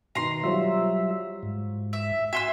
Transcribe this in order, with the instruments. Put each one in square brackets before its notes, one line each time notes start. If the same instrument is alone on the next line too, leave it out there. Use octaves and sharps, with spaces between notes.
[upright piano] B2 D#3 [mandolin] A#5 C6
[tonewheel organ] F#3 G3 E5 [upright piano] F4 F#4 C5
[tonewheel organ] G#2
[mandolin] E5
[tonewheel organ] F#4 G#5 [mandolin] E5 C6 E6